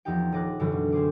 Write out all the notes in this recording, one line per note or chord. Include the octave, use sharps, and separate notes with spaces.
E2 F3 D#4 G4 G5
D#1 D#5 D6 F#6
F#2 B2 D3 E3 F#3
B2
C4 G#4 C5 D6